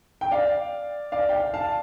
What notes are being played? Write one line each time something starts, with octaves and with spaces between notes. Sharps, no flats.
G5
D5 F5
D5 F5
G5
D5 F5
F5 A5